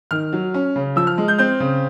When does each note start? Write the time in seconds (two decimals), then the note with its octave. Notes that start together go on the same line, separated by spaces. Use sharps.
0.11 D#3 F6
0.33 F#3
0.54 C#4
0.76 C#3
0.96 F3 E6
1.07 F6
1.18 G#3
1.28 G6
1.38 C4 G6
1.60 C#3